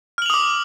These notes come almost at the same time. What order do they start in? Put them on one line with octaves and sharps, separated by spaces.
F6 F#7 F7 D#6 D6